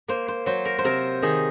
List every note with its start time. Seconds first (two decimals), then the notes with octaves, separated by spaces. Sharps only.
0.08 A#3 C5
0.28 C5
0.46 F#3 C5
0.65 A#4
0.79 C5
0.85 C3 A#4
1.22 D#3 G#4